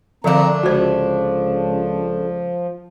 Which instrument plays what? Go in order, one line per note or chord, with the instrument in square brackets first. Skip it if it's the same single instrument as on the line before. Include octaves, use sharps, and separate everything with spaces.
[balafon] D3 F3 F5 [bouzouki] A3 D4 [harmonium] C4 A#5
[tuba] C#2 [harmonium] F3 [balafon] F#4 C5